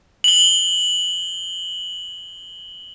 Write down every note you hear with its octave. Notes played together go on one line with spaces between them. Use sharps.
F#7 G7